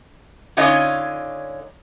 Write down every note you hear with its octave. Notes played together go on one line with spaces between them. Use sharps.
D3 C#4 D#4 F4 C#5 D#5